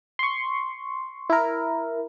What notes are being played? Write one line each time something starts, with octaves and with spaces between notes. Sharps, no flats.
C6 C#6
E4 A#4